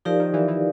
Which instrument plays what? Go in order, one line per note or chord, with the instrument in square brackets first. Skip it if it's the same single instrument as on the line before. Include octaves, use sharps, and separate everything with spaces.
[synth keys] F3 [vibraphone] D#4 G4 A#4 D5 F5
[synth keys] D#3
E3
E3